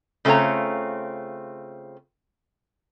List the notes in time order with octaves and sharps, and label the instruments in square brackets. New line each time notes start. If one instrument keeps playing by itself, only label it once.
[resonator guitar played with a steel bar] C#3 A3 C4 F4 C#5 A#5